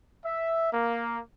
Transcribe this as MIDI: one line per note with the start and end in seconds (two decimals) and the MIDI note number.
0.23 0.71 76
0.71 1.19 58